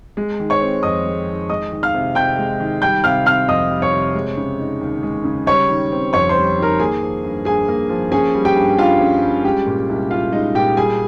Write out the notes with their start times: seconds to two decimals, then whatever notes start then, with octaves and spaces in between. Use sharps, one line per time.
0.17 G#3
0.40 D#3
0.50 C#5 C#6
0.61 C4
0.83 F2 D#5 D#6
1.05 G#3
1.27 D#3
1.50 G#3 D#5 D#6
1.72 D#3
1.83 F5 F6
1.94 C3
2.15 C3 G5 G6
2.39 G#3
2.60 D#3
2.82 G3 G5 G6
3.04 C3 F5 F6
3.26 C4 F5 F6
3.48 F2 D#5 D#6
3.71 G3
3.82 C#5 C#6
3.93 C3
4.15 G#3
4.37 C#3
4.59 D#4
4.81 D#2
5.03 G#3
5.24 C#3
5.47 G3 C#5 C#6
5.69 D#3
5.92 C4
6.13 F2 C#5 C#6
6.29 C5 C6
6.35 G3
6.58 D#3 A#4 A#5
6.79 A#3 G#4 G#5
7.02 F3
7.23 G2
7.45 G2 G#4 G#5
7.68 A#3
7.89 F3
8.12 C#4 G#4 G#5
8.35 G3
8.45 G4 G5
8.56 G2
8.78 G2 F4 F5
9.00 C#4
9.22 G3
9.44 G#3 G4 G5
9.67 A#2
9.89 C2
10.11 C2 F4 F5
10.32 G#3 D#4 D#5
10.55 A#2 G4 G5
10.77 G3 G#4 G#5